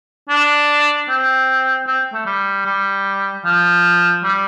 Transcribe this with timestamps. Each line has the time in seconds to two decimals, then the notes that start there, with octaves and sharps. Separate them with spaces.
0.29 D4
1.09 C4
1.87 C4
2.13 A3
2.26 G3
2.66 G3
3.45 F3
4.24 G3